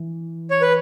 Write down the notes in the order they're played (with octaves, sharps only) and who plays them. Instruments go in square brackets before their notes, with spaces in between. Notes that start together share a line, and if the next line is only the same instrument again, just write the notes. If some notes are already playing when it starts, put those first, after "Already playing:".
Already playing: [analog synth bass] E3
[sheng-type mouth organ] C#5
B4